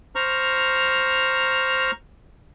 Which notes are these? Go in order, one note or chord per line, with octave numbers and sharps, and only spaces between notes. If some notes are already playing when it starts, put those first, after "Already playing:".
C5 A#5 C#6 F6